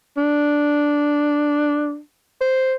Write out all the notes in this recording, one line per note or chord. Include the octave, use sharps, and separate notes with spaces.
D4
C5